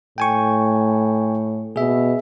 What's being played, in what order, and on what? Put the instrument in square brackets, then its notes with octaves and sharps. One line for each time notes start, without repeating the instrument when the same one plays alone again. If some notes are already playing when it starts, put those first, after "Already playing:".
[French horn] A2 [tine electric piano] G5 G#5 C#6
[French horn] B2 [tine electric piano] G#4 E5